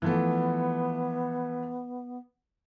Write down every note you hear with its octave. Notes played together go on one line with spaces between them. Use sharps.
E3 F3 A3 B3